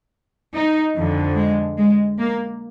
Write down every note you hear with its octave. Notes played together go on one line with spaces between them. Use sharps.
D#4
F2 D3 F3
G#3
G#3
A#3